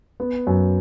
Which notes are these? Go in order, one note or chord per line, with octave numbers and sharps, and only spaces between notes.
B3
F#2